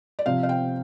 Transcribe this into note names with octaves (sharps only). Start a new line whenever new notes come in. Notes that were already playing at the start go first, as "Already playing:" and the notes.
D5
C3 F3 C4 F5
F5
G5